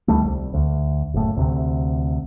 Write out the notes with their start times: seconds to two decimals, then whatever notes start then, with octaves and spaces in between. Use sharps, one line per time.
0.08 D2 D#3 G3 A3
0.24 C2
0.54 D2
1.14 F#1 A2
1.37 D2 C3